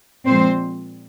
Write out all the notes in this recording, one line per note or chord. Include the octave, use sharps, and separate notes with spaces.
A#2 F3 G#3 C4 C5